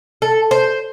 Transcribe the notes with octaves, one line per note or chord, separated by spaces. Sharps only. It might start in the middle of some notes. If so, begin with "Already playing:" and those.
A4
C5